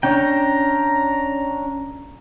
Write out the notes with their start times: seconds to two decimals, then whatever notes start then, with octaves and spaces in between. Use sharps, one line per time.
0.03 C#4 D4 G5 A#5